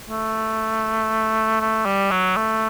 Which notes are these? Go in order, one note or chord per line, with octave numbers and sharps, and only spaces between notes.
A3
A3
G3
F#3
A3